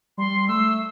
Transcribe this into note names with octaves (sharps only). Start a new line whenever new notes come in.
G3 C6
A3 E6